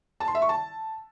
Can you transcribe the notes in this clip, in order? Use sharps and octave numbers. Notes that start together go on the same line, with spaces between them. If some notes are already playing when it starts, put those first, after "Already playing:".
A5
C6
E5
C#6
A5